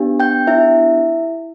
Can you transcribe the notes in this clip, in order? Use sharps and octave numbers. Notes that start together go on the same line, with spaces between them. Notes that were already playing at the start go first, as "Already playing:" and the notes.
Already playing: B3 D4 G4
G5 G6
E4 E5